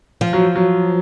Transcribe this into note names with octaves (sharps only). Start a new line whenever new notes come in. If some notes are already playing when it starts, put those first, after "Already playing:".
F3
F#3
F#3